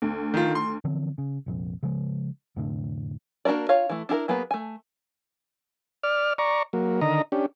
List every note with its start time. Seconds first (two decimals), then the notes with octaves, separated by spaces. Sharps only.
0.02 D2
0.34 D#3 F4
0.55 C6
0.85 D3 E3 F3 C4
1.18 C#3
1.46 F1 A#1 F2
1.83 C#3 F3 G#3
2.56 F1 A2 D3
3.45 A#3 D4 F#4 A#4 D5
3.69 F4 C#5 F5
3.89 E3 A3
4.09 D4 E4 G#4 A#4
4.28 F#3 A#3 B3 G#4 B4
4.51 A3 G#5
6.03 D5 F6
6.38 D5 A#5 C#6
6.73 F#3 A#3
7.01 D3 D#3 D#5 A#5
7.32 C#4 D4 G4